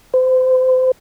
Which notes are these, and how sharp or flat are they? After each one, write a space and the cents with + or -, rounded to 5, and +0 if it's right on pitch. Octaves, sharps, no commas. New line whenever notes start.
C5 -30